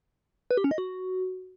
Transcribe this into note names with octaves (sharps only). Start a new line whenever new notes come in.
B4
G4
C#4
D#5
F#4